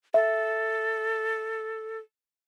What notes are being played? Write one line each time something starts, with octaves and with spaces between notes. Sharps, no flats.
A4 E5